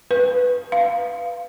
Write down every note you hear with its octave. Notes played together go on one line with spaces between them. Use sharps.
B4
F5